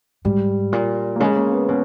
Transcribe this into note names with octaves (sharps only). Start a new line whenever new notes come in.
G#2 G3
A#2
A#3
C#3 G#3
A#3
B3
B2 C#4